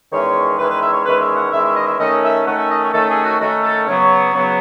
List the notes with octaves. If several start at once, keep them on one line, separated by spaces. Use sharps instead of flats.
E2 D#3 G#3 C#4 E4 C#5
E2 D#3 G#3 C#4 E4 B4
B4
E5
C#5
E2 D#3 G#3 C#4 E4 B4
E5
F#5
E2 D#3 G#3 C#4 E4 E5
E5
D#5
E5
D#3 A3 C#4 D#5
E5
D#3 A3 C#4 F#5
E5
D#5
C#5
D#3 A3 C#4 A4
G#4
F#4
D#3 A3 C#4 F#4
A4
C#3 F#3 B3 C#5
C#3 F#3 B3